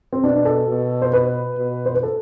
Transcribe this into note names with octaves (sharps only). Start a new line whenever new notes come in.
C4
B2 D4
A4
B2
C5
B4
B2
C5
B4
A4